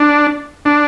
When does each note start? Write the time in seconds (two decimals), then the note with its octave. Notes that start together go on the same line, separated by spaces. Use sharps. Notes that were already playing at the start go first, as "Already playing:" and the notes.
Already playing: D4
0.65 D4